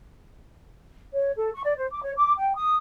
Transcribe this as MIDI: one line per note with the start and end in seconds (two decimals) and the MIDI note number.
1.13 1.31 73
1.37 1.49 69
1.53 1.60 85
1.65 1.75 74
1.77 1.86 72
1.91 2.02 86
2.03 2.11 73
2.16 2.33 86
2.39 2.53 79
2.55 2.75 87